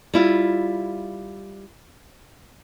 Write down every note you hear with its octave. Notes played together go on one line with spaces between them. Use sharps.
G3 E4 F4